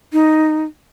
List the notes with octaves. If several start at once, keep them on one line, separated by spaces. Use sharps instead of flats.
D#4